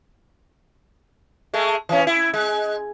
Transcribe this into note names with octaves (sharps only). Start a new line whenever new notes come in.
G#3 A3
E3 C#4
E4
G#3